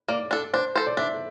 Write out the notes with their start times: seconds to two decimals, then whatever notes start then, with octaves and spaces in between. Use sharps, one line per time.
0.08 A#3 D5
0.31 D4 A4
0.53 D4 C5
0.76 A4 C5
0.86 D5
0.97 D4 E5